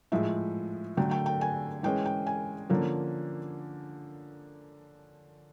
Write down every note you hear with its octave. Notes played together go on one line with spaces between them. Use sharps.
A2 F3 G#3 E5
D3 F#3 A3 G5
G5
G5
G#5
E3 G#3 C#4 G5
G5
G#5
D3 F3 A#3 C#4